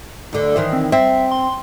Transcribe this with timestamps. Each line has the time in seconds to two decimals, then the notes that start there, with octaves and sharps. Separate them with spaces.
0.33 D2 D3
0.56 D#3 E3 C5
0.73 C4
0.92 C4 E5
1.31 C6